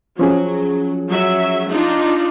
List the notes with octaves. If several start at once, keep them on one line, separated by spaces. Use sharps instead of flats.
F3 F#3 C#4 G#4
F#3 E5
D4 D#4 F4